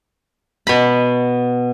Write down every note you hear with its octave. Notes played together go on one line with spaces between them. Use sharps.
B2 B5